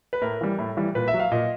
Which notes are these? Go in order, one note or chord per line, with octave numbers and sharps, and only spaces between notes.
B4
A2 A#4
E3 G3
A2
E3 G3
A#2 B4
E5
F#3
F5
A#2 D#5